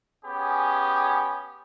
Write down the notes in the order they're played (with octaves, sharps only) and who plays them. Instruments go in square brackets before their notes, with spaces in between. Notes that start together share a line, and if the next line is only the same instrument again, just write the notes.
[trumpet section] B3 C#4 G4 G#4